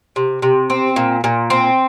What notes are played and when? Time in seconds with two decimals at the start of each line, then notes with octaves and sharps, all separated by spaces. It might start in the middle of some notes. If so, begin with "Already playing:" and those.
0.16 C3
0.42 C3
0.70 C4
0.96 A#2
1.24 A#2
1.50 C4